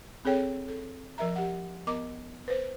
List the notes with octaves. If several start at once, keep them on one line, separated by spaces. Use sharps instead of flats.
C4 G#4 A4 C#5 G5
A4
F3 A#4 E5 A#5
G4 F#5
B3 A#4 D#5 A#5 D6
B4 C5